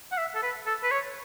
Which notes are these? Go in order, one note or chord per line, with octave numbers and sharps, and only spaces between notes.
F#5
E5
A4
B4
A4
B4
C#5